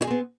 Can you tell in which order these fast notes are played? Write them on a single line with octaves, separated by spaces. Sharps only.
E4 G#4 C4 B3